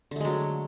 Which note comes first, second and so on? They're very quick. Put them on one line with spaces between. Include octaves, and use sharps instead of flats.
D3 A3 G#3 F#3